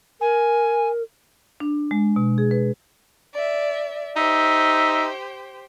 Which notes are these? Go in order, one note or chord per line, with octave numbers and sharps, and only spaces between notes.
A#4 G#5
D4
G#3
B2
G#4
B4
D5 E5
D#4 G4 C5 E5